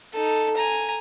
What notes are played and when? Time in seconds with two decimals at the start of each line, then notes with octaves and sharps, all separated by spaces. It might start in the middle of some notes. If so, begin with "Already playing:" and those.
0.13 D#4 A4
0.57 G#5 A#5